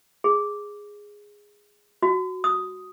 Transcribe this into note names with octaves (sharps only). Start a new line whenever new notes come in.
G#4
F#4
D#6